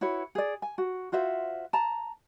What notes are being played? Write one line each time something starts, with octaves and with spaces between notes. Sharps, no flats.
E4 F#4 B4 C#5
G#4 D5
G#5
F#4
F4 F#4 C5 E5
A5 A#5